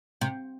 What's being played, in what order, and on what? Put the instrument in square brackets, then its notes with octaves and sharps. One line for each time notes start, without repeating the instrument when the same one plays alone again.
[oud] C3